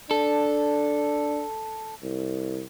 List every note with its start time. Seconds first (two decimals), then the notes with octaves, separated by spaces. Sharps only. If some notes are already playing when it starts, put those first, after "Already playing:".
0.11 D4 A4
2.03 C2